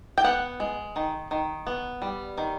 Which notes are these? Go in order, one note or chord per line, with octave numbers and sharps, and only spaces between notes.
G5
B3 F#5
G#3
D#3
D#3
B3
G3
D#3